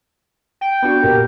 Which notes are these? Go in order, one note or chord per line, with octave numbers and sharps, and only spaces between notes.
G5
B3 D4 F#4
A#2 G4 A#4